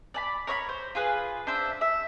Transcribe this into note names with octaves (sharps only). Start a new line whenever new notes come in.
D5 A5 B5
A#4 C#5 E5 B5
C5
F4 G#4 B4
D4 C5 E5
E5